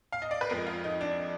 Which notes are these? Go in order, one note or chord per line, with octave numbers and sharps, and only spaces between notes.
F5
D#5
D5
B4
F2 F3 G#3 A#4
F4
D#4
D4